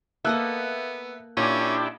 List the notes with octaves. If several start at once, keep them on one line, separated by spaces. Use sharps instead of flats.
A#3 B3 A4 D#5 E5 E6 F#6
A#2 C#4 D4 E4 G4 D#5